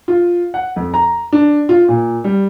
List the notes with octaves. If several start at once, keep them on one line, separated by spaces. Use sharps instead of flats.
F4
F#5
F2
A#5
D4
F4
A#2
G3